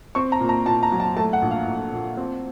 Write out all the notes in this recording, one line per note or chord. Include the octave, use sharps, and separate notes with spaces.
C4 C#6
A#5
A#2
A#5
A#2 A5
A#5
F#3
A5
A3 A5
F#5
A#1
F5
A#1
A#2
C4